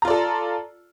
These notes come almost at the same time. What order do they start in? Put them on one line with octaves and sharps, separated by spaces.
A#5 F4 D5 A4